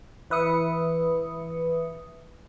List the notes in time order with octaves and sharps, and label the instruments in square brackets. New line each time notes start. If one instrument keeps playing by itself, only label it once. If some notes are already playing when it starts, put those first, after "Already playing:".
[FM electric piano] E3 B4 E5 D#6 C#7